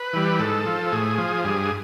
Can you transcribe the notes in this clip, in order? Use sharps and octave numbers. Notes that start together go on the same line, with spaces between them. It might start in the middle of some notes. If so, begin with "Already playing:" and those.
Already playing: B4
E3 G3
G#2 A4
F3
A2 G#4
F3
G2 G#4